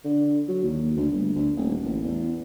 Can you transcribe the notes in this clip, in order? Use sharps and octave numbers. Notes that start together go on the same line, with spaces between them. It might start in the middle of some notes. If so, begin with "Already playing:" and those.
D3
F#3
D#2
D2
G1
D2
D#1
A1
E2